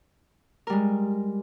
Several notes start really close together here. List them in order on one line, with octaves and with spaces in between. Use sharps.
A#4 G3 G#3